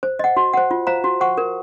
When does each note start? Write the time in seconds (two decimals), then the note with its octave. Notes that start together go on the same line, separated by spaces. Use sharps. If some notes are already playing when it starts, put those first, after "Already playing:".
0.03 C5
0.19 D#5 F#5
0.37 F#4
0.53 C5 F#5
0.71 F4
0.87 C5 F5 A#5
1.04 F#4
1.21 C5 F#5 C#6
1.38 A#4